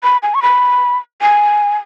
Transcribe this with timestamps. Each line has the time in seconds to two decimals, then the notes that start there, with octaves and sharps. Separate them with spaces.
0.03 B5
0.23 G#5
0.35 C#6
0.42 B5
1.21 G#5